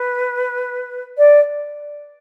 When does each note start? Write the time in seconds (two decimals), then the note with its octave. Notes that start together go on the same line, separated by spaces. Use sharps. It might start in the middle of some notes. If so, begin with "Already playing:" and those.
Already playing: B4
1.18 D5